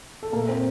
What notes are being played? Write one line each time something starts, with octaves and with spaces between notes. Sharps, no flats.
A4
A#2 A3 A#3 A#4
C4 C5